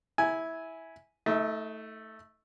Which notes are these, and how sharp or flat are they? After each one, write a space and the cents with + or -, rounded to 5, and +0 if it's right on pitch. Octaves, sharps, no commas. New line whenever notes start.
E4 -15 G#5 +0
A3 +0 D#4 +40